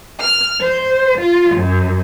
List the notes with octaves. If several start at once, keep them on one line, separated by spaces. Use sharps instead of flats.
F6
C5
F4
F#2